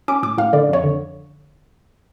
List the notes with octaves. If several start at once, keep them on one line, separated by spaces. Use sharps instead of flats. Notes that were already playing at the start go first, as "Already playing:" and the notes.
C#4 D6
A2 D6
A2 F5
D3 D5
F2 C#5
D3